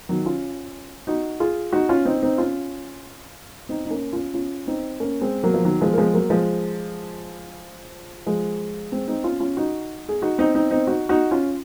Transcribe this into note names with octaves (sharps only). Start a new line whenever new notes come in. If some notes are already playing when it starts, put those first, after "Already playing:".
D#3 F#3
C#4 F4
D#4 F#4
F4 G#4
D#4 F#4
C#4 F4
C4 D#4
C4 D#4
C#4 F4
C4 D#4
D#4
A#3 C#4
C#4 F4
C#4 F4
C4 D#4
A#3 C#4
G#3 C4
F#3 A#3
F3
D#3 F#3
F3 G#3
A#3
F3 G#3
F#3 A#3
F3 G#3
F3 G#3
G#3 C4
C4 D#4
C#4 F4
C#4 F4
D#4 F#4
G#4
D#4 F#4
C4 D#4
C4 D#4
C4 D#4
D#4 F#4
D#4 F#4
C#4 F4